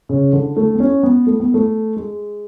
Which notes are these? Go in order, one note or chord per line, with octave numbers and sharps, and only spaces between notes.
C#3
D3
A3
B3
C#4
B3
A3
B3
A3
G#3